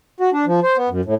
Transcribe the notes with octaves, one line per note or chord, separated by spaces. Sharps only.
F#4
D4
F3
C5
B3
F#2
A2